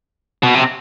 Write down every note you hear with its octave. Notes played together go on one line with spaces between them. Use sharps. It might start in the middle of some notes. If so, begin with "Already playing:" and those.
B2
C3